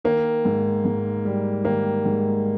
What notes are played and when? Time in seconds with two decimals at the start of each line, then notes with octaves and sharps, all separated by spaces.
0.05 D#3 A#3
0.45 G#2
0.85 G#2
1.25 G3
1.64 D#3 A#3
2.05 G#2